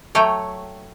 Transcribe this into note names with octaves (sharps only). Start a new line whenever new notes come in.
F#3 A3 C#5 G5